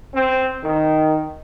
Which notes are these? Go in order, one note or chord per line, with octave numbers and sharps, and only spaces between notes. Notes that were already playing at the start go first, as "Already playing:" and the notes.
C4
D#3